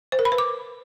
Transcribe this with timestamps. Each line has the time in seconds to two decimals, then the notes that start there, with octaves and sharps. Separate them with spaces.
0.12 C5
0.19 A#4
0.25 B5
0.32 B4
0.38 D6